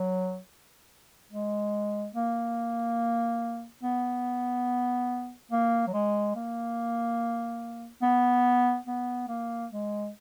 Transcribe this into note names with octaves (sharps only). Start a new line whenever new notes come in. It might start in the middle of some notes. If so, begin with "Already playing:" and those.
Already playing: F#3
G#3
A#3
B3
A#3
F#3
G#3
A#3
B3
B3
A#3
G#3